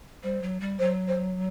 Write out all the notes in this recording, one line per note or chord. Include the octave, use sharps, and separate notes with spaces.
G3 C5
F#3
G3
F#3 C5
C5